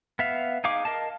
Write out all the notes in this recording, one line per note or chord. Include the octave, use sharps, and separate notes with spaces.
B3 E5 F5
D#4 G#4 F5 D6
A#4 D#5 F5 A5